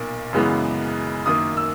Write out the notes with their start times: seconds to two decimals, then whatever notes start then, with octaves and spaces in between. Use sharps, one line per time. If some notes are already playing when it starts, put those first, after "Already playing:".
Already playing: B1 A#2 A#3
0.33 F#2 C#3 E3 G#3 B3
1.26 F#2 D#3 A#3 D#6
1.57 E6